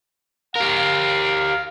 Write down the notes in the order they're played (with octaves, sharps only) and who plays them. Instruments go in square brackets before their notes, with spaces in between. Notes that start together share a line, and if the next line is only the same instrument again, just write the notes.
[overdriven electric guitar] G4 A#4 [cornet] F5